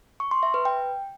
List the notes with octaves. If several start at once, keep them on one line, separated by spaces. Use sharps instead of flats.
C#6
C6
E5
B4
G5